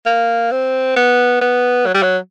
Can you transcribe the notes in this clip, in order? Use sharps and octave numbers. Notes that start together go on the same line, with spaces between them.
A#3
C4
B3
B3
F#3
G3
F#3